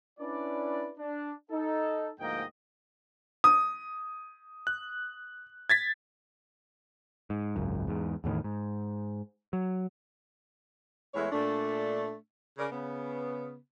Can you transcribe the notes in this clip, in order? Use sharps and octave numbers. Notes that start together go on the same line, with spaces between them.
C#4 D4 E4 B4 D5
D4
D#4 A4
D2 G#2 F3 A#3 D#5 G5
D#6
F#6
G#6 A6 B6
G#2
G#1 C#2 F#2
E2 G#2
E2 A2 D3 D#3
G#2
F#3
E2 G#3 A3 E4 B4 C#5
A#2 A3 D4
C#3 A#4 D5
C#3 B3